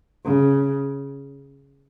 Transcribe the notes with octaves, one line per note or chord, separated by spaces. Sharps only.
C#3